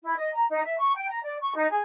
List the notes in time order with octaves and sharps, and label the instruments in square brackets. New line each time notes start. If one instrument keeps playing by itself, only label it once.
[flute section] E4
D#5
A#5
D#4
E5
C#6
G5
A#5
D5
C#6
D#4
G#4